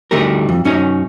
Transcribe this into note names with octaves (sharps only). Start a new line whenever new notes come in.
D2 D#3 G3 A3 G4 A#4
F2
F#2 C#4 D#4 C#5